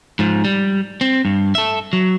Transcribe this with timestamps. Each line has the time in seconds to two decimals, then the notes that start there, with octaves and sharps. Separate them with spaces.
0.19 G#2 F3
0.45 G3
1.01 C4
1.25 G2
1.55 A4 E5
1.93 F#3